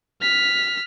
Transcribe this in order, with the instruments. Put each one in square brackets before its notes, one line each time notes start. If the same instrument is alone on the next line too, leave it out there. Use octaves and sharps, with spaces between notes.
[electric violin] F6 B6